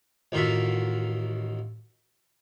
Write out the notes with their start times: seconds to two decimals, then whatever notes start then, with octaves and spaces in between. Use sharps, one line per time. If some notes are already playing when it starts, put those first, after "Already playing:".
0.32 A1 D#3 F4 F#4 E5